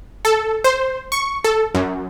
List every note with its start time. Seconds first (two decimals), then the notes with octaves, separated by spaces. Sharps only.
0.25 A4
0.64 C5
1.12 C#6
1.44 A4
1.75 F#2